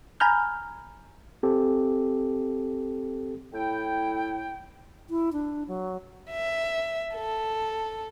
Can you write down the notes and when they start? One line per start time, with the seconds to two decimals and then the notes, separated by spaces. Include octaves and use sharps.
0.20 G#5 A#5 B5 F6 G6
1.43 C4 G4 A4
3.53 A2 E4 G5
5.10 E4
5.33 D4
5.68 F#3
6.31 E5
7.15 A4